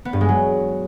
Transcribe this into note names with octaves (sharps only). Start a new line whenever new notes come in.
B3
G2
G#3
F#3